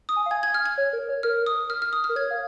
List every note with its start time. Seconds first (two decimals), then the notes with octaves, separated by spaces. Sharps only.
0.09 D#6
0.16 G#5
0.26 F5
0.31 G#5 G#6
0.43 G#6
0.54 F6
0.66 G#6
0.78 C#5
0.93 A#4
1.09 C#5
1.23 A#4 F6
1.46 D#6
1.70 F6
1.82 F6
1.93 D#6
2.04 F6
2.09 A#4
2.16 C#5 G#6
2.31 F5